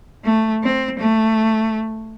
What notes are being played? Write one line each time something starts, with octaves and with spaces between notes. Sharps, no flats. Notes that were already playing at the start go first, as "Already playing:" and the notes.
A3
C4
A3